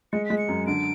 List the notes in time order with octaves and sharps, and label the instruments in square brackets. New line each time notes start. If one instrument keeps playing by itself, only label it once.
[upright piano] G#3 [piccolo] C#7
[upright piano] G#3 [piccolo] B6
[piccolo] C#7
[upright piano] F#2
[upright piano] D3 [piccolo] D7